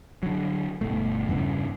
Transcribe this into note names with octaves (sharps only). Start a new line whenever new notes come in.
D3 F#3
G1 B2 A3
E2 G2 C#3 E3